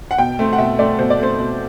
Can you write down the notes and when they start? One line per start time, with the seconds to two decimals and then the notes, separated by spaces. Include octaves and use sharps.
0.11 F#5
0.18 B2 G5
0.39 A3 C4
0.53 F#5
0.58 B2 E5
0.79 A3 C4 D5
0.99 B2 C5
1.10 D5
1.19 A3 C4 C5
1.38 B2